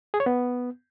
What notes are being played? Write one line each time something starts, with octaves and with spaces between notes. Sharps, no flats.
G#4
C#5
B3